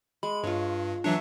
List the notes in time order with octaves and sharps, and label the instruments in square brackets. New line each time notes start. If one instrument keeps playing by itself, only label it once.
[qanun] G#3 [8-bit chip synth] B5
[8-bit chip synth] G2 [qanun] F4 C#5
[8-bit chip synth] E3 F#3 D4 [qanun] C#5 E5 F#5